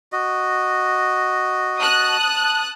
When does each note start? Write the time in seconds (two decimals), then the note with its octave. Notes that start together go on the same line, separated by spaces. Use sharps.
0.12 F#4 D#5
1.79 A5 D#6 F#6